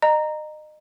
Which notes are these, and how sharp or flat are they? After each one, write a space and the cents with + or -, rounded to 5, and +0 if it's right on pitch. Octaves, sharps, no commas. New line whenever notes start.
D#5 -30 A#5 +0